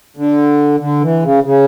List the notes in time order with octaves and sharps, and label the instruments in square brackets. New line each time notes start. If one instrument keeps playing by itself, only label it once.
[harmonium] D3
D3
E3
C#3
C#3